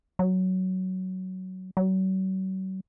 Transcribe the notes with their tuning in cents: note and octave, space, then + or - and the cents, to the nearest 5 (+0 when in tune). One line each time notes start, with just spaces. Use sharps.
F#3 +10
F#3 +40